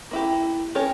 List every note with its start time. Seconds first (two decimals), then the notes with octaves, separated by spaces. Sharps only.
0.11 A#3 E4 G4
0.75 C#4 G4 A#4 C#5